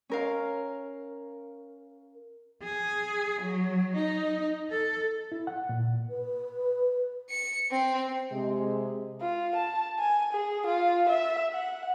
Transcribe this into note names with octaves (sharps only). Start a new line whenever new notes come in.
C#4 A#4 F5
G#4
F#3
D#4
A4
E4
F#5
A#2
B4
C#7
C4
C3 G#3
F4
A5
G#5
G#4
F4
E5
F#5